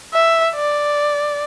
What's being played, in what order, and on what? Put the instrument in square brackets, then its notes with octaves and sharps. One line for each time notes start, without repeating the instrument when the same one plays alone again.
[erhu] E5
D5